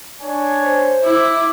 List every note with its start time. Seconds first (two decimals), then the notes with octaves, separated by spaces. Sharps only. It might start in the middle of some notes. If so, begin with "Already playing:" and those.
0.20 D4 C#5 G#5
0.63 C5
1.04 E4 D6